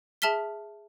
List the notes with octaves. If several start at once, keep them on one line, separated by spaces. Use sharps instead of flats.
G#4 E5 A5 F6 B6 G7